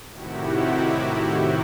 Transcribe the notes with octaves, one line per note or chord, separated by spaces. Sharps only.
A2 C3 D#3 E4 F#4 G4